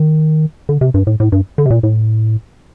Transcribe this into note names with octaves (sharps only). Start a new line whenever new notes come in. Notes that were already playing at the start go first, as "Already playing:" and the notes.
Already playing: D#3
D3
C3
G2
A2
A2
G2
D3
C3
A#2
A2